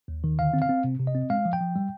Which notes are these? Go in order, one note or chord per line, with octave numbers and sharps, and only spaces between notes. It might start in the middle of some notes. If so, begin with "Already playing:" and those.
D#2
D#3
D3 F5
C4
F5
C4
C3
C3
D#5
C4
G#3 F5
F3
G5
F3
G3